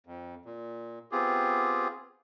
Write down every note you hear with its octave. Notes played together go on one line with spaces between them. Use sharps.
F2
A#2
B3 C4 F4 G4 G#4